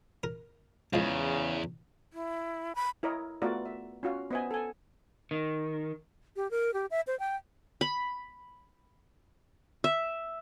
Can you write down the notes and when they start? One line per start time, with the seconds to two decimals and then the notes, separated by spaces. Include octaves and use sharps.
0.23 A#4
0.93 E2 C#3 F3 G#3
2.13 E4
2.75 B5
3.03 E4 A#4 C#5 D#5
3.42 A3 B3 F4 F#4 A#4 D5
3.65 E5
4.03 C#4 F4 F#4 F5
4.31 B3 C5 D#5 E5 G#5
4.51 A4 G#5
5.31 D#3
6.36 G4
6.51 A#4
6.74 G4
6.91 E5
7.07 C5
7.19 G5
7.81 B5
9.84 E5